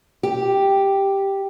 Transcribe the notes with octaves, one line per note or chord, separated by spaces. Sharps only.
G4